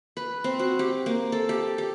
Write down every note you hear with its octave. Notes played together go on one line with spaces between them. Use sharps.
B4
C4
F#4
G4
A#3
A4
G4
G4